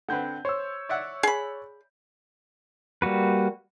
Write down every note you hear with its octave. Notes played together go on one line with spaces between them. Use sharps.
D3 C4 B4 F#5 G6
C5 C#5 E6
D5 E5 F#5
G#4 B5
G3 A#3 F#4 B4